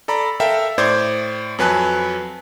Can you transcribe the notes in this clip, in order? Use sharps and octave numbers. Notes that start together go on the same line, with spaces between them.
A4 D5 A#5 B5
A4 A#4 E5 F5 G5
A2 C5 D5 D6 G6 G#6
F2 F#3 B4 G#5 A5 F#6